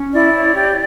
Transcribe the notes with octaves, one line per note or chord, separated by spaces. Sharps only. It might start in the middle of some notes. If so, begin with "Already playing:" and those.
Already playing: C#4
E4 D5
C#5
G4